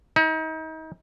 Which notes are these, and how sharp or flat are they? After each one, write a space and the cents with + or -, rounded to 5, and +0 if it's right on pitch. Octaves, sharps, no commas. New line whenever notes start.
D#4 +35